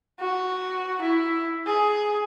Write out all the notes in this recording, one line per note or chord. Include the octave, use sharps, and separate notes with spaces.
F#4
E4
G#4